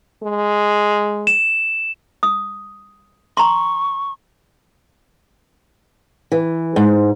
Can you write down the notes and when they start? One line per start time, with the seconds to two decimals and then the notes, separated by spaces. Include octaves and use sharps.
0.23 G#3
1.27 E7
2.23 D#6
3.37 A#5 C6 C#6
6.32 E3
6.76 G#2